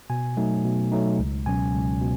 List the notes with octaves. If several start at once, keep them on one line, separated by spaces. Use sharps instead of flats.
B2 G#5
F#3 A3 D#4
B2
F#3 A3 D#4
C#2
B2 F#3 C#4 G#5
C#2
B2